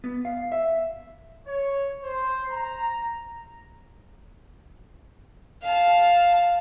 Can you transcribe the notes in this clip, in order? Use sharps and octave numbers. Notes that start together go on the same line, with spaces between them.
B3
F5
E5
C#5
C5
A#5
F5 A5